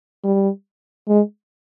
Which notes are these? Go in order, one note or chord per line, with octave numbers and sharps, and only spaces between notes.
G3
G#3